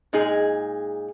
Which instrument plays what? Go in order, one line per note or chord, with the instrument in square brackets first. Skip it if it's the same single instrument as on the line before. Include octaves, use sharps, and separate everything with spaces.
[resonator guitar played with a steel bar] A#2 G#3 D#4 G#4